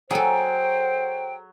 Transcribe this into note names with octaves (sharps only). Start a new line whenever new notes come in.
F#3 G#4 A4 C5 G5